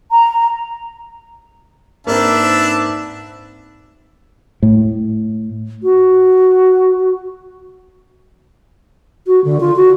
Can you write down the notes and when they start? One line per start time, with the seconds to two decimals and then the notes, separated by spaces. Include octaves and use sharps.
0.10 A#5
2.07 G#2 A#3 C4 D4 B4 E5 A5
4.63 A2
5.83 F#4
9.27 F#4
9.45 D3
9.60 F4
9.76 F#4